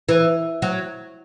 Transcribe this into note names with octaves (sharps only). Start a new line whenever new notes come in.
E3
F#3